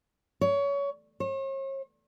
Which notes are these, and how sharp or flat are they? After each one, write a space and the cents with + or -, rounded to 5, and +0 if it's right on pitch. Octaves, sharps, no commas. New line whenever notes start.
C#5 +25
C#5 -45